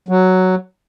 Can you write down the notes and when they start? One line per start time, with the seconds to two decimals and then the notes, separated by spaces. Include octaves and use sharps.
0.09 F#3